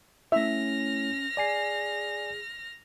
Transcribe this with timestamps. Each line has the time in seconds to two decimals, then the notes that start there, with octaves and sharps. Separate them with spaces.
0.32 A3 C#4 E4 E5 F6 A#6
1.37 G#4 D5 G#5 C7